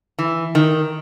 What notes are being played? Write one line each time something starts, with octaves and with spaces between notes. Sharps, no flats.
E3
D#3